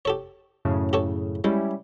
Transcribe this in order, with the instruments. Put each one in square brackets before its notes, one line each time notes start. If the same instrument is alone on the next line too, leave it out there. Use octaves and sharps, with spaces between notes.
[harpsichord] G4 A4 C#5
[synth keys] F#2 A2 C#3
[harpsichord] G4 A4 C#5
[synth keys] G3 C#4 E4 [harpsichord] G#3